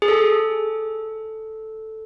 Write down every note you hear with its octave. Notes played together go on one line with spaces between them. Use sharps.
G#4
A4